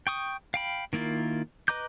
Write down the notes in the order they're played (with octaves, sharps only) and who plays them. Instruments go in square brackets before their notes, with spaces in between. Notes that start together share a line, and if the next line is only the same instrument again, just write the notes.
[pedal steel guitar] G5 C#6 D#6
F5 G5 B5
D#3 A#3 E4 F4
B4 D#5 A#5 D6 G6